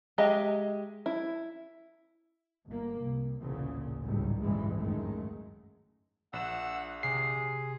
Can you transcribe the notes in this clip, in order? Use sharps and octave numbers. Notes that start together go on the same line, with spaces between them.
G#3 G4 G#4 D#5 E5
E4
G1 A#3
C2
A1 D2 A#2 C#3
G#1 C#2 A2 F#3 G3
A1 D2 G2 B2 E3 G#3
G#1 F#2 D#3 G#3 A3
A#1 F#5 E6 E7
C3 G#4 C7